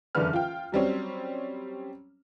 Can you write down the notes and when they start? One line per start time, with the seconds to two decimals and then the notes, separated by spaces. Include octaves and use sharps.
0.15 F#1 E2 D3 B4 F6
0.33 F4 G5
0.72 F#3 G3 C4 C#4